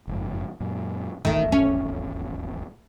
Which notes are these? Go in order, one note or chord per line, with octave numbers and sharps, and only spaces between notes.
F#1 F2 G#2
F#2 A#2
D#1 G#1 E2 D#3 A3
C#4